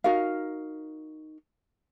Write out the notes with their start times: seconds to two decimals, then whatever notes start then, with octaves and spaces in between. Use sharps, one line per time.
0.04 D#4 F#4 A#4 F5